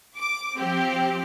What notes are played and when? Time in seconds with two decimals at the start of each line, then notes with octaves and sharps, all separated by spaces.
0.16 D6
0.57 F3 C4 G4